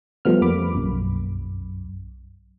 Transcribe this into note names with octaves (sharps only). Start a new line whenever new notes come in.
F3 G3 A3 B3 F6
F2 A#3 B5 D6
B1 F#2